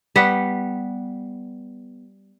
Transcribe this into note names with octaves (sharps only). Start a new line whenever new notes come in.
G3 B3 B4 F#5